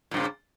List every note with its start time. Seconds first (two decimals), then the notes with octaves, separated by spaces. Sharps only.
0.11 A#2
0.14 G2
0.17 C#3